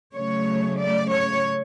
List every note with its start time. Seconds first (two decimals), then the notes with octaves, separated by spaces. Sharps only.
0.15 C#3 F#3 A3 C#5
0.78 D5
1.10 C#5